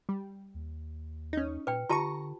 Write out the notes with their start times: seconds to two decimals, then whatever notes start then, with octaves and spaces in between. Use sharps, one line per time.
0.09 G3
0.54 D#2
1.33 C#4 D#4
1.67 A#2 B4 G5
1.90 D3 F4 G4 A5 A#5 C#6